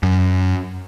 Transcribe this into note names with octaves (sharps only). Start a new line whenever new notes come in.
F#2